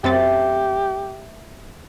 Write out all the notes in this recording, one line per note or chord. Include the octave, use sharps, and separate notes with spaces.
F#2 A3 C4 G4 A6